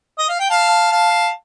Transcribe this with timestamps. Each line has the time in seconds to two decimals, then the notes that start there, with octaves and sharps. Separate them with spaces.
0.18 D#5
0.29 F5
0.40 G5
0.50 F5 A5
0.92 F5 A5